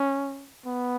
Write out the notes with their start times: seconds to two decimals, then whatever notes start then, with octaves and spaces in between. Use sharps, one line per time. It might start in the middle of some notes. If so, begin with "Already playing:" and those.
Already playing: C#4
0.66 B3